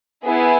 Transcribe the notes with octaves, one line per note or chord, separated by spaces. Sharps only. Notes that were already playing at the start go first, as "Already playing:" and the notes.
B3 E4 G#4